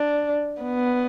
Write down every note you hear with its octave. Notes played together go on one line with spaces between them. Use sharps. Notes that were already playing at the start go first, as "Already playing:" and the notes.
Already playing: D4
B3